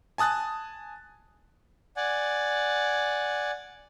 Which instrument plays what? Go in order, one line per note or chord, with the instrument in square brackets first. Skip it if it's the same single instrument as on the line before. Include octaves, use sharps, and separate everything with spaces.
[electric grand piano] G#5 A5 D#6 F#6 A6
[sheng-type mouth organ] D5 F#5 G#5